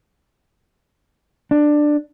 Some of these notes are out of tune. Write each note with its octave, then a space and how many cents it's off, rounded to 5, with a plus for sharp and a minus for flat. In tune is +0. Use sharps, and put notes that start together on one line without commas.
D4 +15